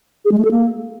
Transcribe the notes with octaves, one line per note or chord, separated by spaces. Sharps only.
G#4
G#3
A3
A4
A#3